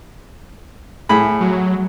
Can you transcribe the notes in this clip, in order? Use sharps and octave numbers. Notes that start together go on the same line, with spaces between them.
A2 G#4 B5
F#3